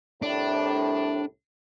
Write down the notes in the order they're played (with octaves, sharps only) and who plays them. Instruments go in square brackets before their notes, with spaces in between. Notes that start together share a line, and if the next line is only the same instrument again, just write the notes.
[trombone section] C2 A2 [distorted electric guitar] D4